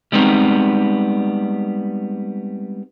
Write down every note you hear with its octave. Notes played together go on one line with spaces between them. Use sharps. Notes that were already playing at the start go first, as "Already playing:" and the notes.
G3 G#3 B3 C4 D#4